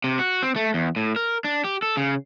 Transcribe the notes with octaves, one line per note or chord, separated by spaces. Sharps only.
C3
F#4
C4
A3
E2
A2
A#4
D4
G4
A4
C#3